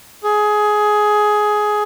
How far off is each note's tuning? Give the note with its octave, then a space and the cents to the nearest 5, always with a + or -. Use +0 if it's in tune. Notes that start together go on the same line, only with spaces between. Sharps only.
G#4 +15